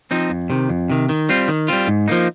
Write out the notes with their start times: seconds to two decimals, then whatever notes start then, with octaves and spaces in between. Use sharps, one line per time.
0.11 F3 C4 D#4
0.30 F2
0.50 C3 D#3
0.69 F2
0.90 C3 D#3
1.09 D#3
1.29 G3 C4 F4
1.48 D#3
1.68 G3 C4 F4
1.88 G#2
2.08 F3 A#3 D#4